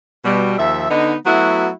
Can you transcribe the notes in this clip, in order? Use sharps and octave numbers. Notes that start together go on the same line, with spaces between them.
B2 G3
D#2 F3 E5
D3 B3 D#4
F#3 A3 B3 E4 F#4